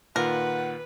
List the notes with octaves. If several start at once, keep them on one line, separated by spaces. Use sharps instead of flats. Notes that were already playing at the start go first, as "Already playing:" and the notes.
A#2 D#3 F4 A#4 B4 F#5